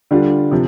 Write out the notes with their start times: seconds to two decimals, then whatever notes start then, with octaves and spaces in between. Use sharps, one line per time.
0.11 D3 G3 D4 F4
0.51 C3 F3